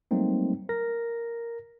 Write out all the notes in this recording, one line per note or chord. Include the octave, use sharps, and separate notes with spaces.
F#3 G3 A3 A#3 C4 D#4
A#4 A#6